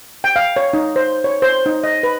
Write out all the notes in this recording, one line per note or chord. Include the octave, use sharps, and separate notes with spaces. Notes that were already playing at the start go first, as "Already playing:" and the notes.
G5
F5
C#5
D#4
C5
C#5
C5
D#4
D#5
B4